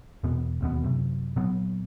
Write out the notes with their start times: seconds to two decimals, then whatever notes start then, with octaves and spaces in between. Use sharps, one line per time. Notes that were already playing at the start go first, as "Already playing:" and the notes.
0.24 E2 B2 B3
0.61 E1 D#2 B2 B3
0.84 F#2 C3
1.36 A#2 F#3 B3